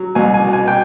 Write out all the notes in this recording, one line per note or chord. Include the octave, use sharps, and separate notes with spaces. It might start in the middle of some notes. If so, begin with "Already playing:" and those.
Already playing: F#3
C2 G#5
G#5
B2
G#5
G5